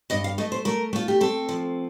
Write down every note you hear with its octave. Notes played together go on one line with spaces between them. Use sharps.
G2 D#5
F5
A3 D#5
C5
A3 A#4
A3 F4
G4
C4 A4
F3